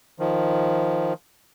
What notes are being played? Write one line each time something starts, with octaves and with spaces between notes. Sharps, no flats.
D#3 F3